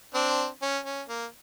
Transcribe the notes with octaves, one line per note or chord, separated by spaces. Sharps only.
C4 D4
C#4
C#4
A#3